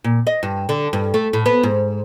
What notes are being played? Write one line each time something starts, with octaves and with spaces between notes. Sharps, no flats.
A#2
D#5
G2
D3
G2
A3
A2
B3
G#2